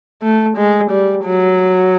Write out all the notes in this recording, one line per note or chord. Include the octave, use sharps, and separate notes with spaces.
A3
G#3
G3
F#3